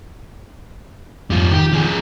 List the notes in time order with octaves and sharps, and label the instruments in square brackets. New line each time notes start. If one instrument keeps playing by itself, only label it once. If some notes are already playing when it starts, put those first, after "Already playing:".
[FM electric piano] F2 G#2 [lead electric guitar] G3 F4
[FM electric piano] D#3 [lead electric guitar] G4
[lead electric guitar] F3 G#4